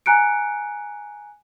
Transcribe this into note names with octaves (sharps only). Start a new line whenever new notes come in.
G#5 A#5 F#6 C#7 D7